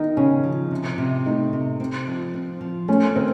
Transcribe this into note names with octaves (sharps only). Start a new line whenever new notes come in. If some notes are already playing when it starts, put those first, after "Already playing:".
Already playing: D#3 D#4
C#3 C#4
F3
C3
C3
A3 D#4
C3
C4
F3
C4
F3
A3 C#4
D#3 C4